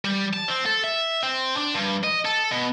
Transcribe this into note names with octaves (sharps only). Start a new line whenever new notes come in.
G3
A5
C4
A4
E5
C4
D4
G2
D#5
A4
B2